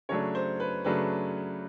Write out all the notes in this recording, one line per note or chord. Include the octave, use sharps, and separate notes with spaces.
C#3 F#3 A3 D4 C#5
C5
B4
C#3 F#3 A3 D4 B4